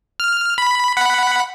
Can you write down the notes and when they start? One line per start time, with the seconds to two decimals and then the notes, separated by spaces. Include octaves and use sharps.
0.20 F6
0.58 B5
0.97 F#5 B5